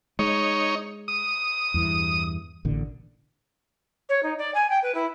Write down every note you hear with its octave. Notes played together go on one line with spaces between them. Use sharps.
G#3 D#4 C#5
D#6
E2 G2 E3
A1 A#2 D3
C#5
D#4
D5
G#5
G5
B4
E4